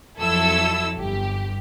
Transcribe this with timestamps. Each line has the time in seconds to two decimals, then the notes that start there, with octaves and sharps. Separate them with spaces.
0.19 F2 F#3 E4 A4 E6
0.95 G1 G4